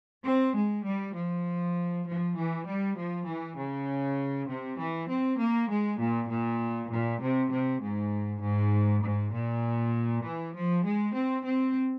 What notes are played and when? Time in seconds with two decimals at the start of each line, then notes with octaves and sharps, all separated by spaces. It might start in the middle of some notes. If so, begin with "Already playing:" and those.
0.24 C4
0.54 G#3
0.85 G3
1.15 F3
2.06 F3
2.36 E3
2.66 G3
2.97 F3
3.27 E3
3.57 C#3
4.49 C3
4.78 E3
5.09 C4
5.40 A#3
5.70 G#3
5.99 A#2
6.30 A#2
6.90 A#2
7.21 C3
7.51 C3
7.81 G#2
8.42 G#2
9.02 G#2
9.32 A#2
10.24 E3
10.54 F3
10.84 G#3
11.14 C4
11.45 C4